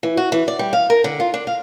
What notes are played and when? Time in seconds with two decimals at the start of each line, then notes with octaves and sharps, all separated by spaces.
0.03 E3
0.17 F#4
0.32 E3
0.48 D5
0.59 G3
0.73 F5
0.90 A#4
1.04 D3
1.20 F4
1.34 D4
1.47 F5